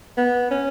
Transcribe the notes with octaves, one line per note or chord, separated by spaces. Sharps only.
B3
C#4